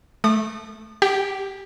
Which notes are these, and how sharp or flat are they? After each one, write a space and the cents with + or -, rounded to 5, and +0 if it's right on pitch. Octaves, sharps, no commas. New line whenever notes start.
A3 -15 D#6 -40
G4 +0 G5 -40